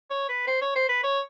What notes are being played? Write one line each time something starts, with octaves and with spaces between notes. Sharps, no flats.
C#5
B4
C5
C#5
C5
B4
C#5